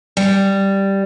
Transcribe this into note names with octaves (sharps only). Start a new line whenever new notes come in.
G3